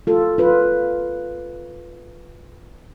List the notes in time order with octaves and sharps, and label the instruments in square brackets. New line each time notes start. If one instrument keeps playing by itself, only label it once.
[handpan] F4 A4
F4 B4